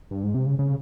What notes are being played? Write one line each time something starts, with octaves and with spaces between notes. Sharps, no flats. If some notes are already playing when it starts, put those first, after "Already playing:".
G2
G#2
C3
C#3
C#3